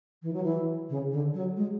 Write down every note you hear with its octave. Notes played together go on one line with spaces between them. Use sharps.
E3
F#3
E3
C#3
D3
F#3
G#3